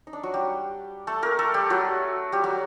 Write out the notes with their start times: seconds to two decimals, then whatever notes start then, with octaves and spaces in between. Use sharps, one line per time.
0.07 D#4
0.13 D4
0.23 F#3 F#4
0.34 G3 G4
1.07 A3 A4
1.22 A#3 A#4
1.39 A3 A4
1.54 G3 G4
1.70 F#3 F#4
2.32 G3 G4
2.44 F#3 F#4